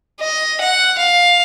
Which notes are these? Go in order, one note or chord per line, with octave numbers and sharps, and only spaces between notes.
D#5
F#5
F5